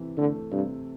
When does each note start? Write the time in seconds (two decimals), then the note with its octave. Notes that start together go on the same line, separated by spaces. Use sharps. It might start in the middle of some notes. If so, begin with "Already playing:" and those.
Already playing: C3 E3
0.18 D3 A3
0.52 G2 C3